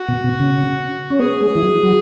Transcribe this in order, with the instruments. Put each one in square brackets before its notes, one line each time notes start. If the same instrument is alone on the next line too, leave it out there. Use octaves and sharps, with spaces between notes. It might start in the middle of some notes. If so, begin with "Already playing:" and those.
Already playing: [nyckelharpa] F#4
[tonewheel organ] B2
B2
C#3
C#4
[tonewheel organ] B3 [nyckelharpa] G#4
[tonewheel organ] G#3
E3
F#3
F#3